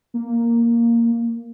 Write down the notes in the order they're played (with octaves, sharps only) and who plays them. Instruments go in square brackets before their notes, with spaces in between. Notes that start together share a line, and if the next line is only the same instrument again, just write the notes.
[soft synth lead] A#3